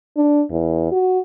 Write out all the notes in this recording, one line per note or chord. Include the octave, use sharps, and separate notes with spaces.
D4
E2
F#4